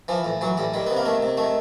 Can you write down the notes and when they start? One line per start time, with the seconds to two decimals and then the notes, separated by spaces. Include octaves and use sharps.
0.08 E3 F3
0.25 A2
0.41 E3 F#3
0.57 A2 G3
0.74 D#3 G3
0.87 C3 B3
0.97 A#3
1.05 D#3 A3
1.22 C3
1.37 D#3 A3